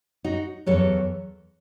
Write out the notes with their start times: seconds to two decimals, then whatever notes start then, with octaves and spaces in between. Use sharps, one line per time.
0.24 D#4 F#4
0.66 B2 F#3 A4 C#5
0.71 E2